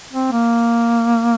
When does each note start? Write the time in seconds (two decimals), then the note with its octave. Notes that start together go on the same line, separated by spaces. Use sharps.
0.12 C4
0.32 A#3